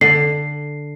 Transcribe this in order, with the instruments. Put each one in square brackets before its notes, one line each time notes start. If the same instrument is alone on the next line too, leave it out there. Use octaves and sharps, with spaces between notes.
[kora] D3 [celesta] C7